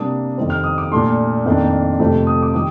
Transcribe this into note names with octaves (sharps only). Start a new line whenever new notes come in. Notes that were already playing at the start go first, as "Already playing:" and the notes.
Already playing: C3 G3 A#3 D4 D#6
F2 D#3 G3 C4
F6
D#6
D6
A#2 A3 D4 C6
F2 D#3 A#3 D4
F2 C3 F3 A3 C4
D#6
D6
D#3 G3 D#6